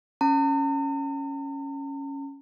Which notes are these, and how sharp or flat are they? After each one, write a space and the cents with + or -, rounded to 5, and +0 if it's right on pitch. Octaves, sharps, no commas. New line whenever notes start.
C#4 +0 A#5 -45